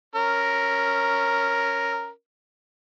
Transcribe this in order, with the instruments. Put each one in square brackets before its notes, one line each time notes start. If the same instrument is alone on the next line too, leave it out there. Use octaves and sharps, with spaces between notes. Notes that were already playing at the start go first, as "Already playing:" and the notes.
[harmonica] C#4 A#4